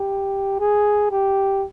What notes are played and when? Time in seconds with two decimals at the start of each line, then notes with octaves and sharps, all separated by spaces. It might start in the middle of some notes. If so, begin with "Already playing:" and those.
Already playing: G4
0.60 G#4
1.11 G4